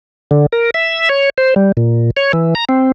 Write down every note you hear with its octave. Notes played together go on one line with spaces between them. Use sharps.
D3
A#4
E5
C#5
C5
G3
A#2
C#5
E3
A#5
C4